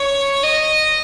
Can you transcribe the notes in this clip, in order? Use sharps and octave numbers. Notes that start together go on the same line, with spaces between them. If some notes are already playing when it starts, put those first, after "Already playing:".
Already playing: C#5
D#5